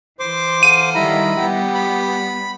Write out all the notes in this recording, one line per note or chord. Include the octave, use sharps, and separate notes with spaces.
E3 C5 C6 D6
A4 F5 F#5 D#7
D#3 G3 E4 D#5 A#5 B5
G3 B3 G4 F#5
B5